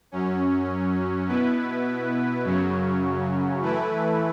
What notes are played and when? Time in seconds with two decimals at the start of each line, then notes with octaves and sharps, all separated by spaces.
0.12 F#2 F#3 C#4
1.28 B2 B3 E4 B4
2.44 F#2 C#3 F#3 C#4
3.60 E3 A3 E4 B4